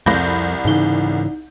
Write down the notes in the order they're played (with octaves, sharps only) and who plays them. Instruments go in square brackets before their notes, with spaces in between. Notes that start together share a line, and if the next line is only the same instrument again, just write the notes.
[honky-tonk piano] C2 B5 G6 [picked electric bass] F2 [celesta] A#6
[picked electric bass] G#2 C#3 E3 [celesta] D#4 G7